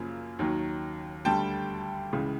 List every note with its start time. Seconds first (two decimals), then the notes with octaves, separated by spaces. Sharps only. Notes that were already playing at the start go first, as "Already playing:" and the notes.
Already playing: F#2 C#3 F3 A#3
0.39 D#2 D#3 F#3
1.25 D2 D3 G3 G5 A5
2.13 C#2 C#3 E3